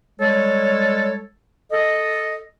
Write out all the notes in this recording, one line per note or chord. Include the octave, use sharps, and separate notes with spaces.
G3 G#3 A4 C#5
A4 D#5